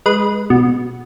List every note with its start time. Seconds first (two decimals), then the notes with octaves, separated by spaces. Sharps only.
0.06 G#3 B4
0.50 B2